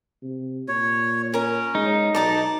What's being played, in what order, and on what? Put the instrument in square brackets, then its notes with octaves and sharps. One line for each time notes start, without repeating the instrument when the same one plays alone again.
[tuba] C3
[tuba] A#2 [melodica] C#5
[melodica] C#4 [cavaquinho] A#4 C#5
[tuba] G#3 [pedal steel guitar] D#4
[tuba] B1 [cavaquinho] D5 A#5 D6 [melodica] A5